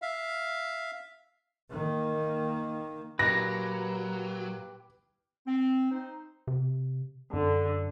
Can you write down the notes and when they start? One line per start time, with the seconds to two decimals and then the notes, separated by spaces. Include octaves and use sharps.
0.02 E5 F5
1.71 D#3 A#3
3.19 A#2 F#3 G4 B4 A#6
5.46 C4
5.91 D#4 C5
6.47 C3
7.34 F#2 D3